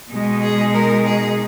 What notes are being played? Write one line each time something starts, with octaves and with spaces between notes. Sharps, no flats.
B2 G#3 D#4
G#4
A#4
G#4